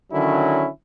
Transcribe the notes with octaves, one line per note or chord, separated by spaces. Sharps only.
D3 D#3 F#3 C#4 E4